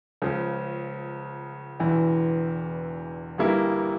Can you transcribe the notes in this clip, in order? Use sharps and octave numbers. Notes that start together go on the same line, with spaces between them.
C#2 C#3 F3
E1 E2 E3
G1 G2 G3 A#3 E4